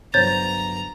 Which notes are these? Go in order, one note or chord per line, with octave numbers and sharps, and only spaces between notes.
G1 F#3 C5 C#5 A#5 G6 A6